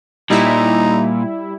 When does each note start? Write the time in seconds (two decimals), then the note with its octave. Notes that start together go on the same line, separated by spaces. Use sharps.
0.30 A#2 G3 D#4 E4